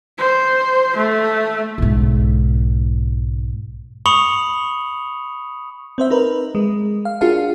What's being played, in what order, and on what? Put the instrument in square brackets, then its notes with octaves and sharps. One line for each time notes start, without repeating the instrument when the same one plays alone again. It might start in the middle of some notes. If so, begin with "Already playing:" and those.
[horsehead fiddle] C5
A3
[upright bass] B1 G#2
[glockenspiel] B5 C#6 D#6 C#7 F7 F#7
[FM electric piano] C4 C5 E5
D#4 A#4 B4
G#3
F5
D4 F4 F#4 G#4 A#4 F5